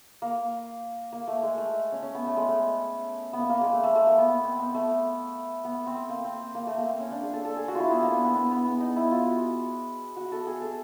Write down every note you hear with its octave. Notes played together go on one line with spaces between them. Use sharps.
A#3
A#3
A3
G#3
A3
C#4
C#4
B3
A3
G#3
A3
B3
A#3
A#3
G#3
A3
A3
A3
A#3
B3
B3
C4
B3
A3
B3
C4
A#3
C4
A#3
A3
A#3
C4
C#4
D4
G#4
A4
A4
G#4
F#4
E4 F4
B3
A#3
B3
B3
B3
B3
B3
D#4
E4
F4
F#4
F#4
A4
G#4
A4